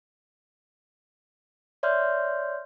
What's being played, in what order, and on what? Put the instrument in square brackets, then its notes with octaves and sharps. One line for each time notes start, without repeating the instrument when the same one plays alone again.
[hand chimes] C#5 D5 E5 C6 F6 G6